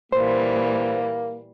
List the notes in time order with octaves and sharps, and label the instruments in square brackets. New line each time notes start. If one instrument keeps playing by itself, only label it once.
[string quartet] A#2 E3 G3 [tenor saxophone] A#3 [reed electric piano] C5